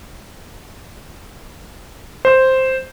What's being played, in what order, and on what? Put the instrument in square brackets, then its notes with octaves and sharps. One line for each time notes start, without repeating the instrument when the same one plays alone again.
[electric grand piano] C5